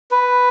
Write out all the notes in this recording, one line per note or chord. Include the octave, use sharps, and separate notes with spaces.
B4